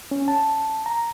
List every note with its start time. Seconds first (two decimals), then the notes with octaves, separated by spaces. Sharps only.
0.11 C#4
0.28 A5
0.86 A#5